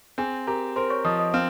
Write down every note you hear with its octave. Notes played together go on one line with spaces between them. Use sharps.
C4 G#4 G#5
G4 A#4 A#5
A#4 C5 C6
C#5 C#6
F3 D#5 D#6
D#5 D#6
C4 F5 F6